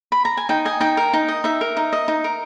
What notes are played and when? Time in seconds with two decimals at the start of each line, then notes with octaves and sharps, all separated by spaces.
0.12 B5
0.25 A#5
0.37 G#5
0.49 D#4 G5
0.65 D#5 G#5
0.80 D#4 G5
0.97 A#4
1.13 D#4
1.28 D#5
1.44 D#4 E5
1.61 A#4
1.77 D#4
1.93 D#5
2.08 D#4
2.24 A#4